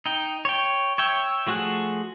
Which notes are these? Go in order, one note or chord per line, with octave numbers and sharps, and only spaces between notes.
D#4 G5
C#5 G5
C#5 E5 G5
F3 A3 F#4 G#4 F#6